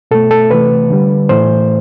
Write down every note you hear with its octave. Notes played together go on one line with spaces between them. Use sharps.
B2 A3 A4
A4
C3 E3 A3 B4
D3 G3
A2 E3 A3 C5